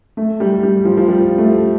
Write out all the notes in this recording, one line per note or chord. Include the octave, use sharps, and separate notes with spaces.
A3
G3
G3
F3
F3
G3
A3